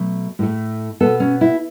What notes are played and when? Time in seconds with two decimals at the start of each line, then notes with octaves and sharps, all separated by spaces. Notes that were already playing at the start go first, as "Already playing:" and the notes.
Already playing: B2 F#3 A3
0.39 A2 A3
1.00 B2 B3 A4
1.20 C#4
1.41 E4